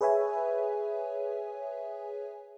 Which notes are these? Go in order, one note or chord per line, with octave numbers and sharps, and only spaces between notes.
G#4 B4 C#5 E5 G#5